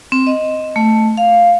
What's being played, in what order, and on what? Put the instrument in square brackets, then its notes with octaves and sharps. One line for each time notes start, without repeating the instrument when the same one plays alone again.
[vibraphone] C4
D#5
A3
F5